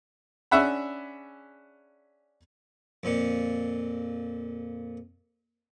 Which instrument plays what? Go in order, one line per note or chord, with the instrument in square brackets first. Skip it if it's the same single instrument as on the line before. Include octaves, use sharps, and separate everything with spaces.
[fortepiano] C#4 D4 G#4 E5 F#5 B5
[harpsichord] F2 A#2